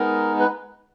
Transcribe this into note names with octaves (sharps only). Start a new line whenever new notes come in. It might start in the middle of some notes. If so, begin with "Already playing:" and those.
Already playing: G#3 B3 D#4 A#4
B4